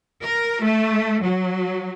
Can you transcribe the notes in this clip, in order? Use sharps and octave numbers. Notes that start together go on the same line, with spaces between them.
A#4
A3
F#3